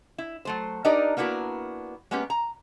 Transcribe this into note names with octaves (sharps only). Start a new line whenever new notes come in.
E4
F#3 A3 C5
D4 D#4 G4 A#4 D5 D#5
A#3 B3 D4 E4 F#4 A#4
G#3 A#3 B3 C#4 G4
A#5